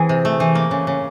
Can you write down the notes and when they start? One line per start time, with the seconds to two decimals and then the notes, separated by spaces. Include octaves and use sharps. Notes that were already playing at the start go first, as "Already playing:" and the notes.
Already playing: E3 C4 G#4
0.09 C3
0.25 A3
0.40 E3
0.55 A#3
0.71 C#3
0.87 C#3